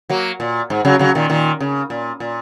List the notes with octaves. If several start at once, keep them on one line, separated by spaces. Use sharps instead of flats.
F#3 A#3
A#2
G#2
C#3 F#3
C#3 F#3
A#2 D#3
A#2 D#3
C#3
A#2
A#2